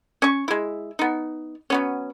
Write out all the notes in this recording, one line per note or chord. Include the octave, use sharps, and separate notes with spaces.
C#4 C#6
G#3 E4
B3 D#4
F#3 B3 C#4